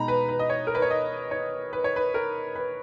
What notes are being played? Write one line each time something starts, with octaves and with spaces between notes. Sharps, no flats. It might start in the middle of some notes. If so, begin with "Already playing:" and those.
Already playing: B2 G#3 D#4 A#5 B5
B4
B4
D#5
C#5
A#4
B4
C#5
D#5
C#5
B4
C#5
B4
A#4
B4